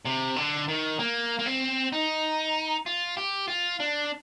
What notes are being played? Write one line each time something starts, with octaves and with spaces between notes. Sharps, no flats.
C3
D3
D#3
A#3
A#3
C4
D#4
F4
G4
F4
D4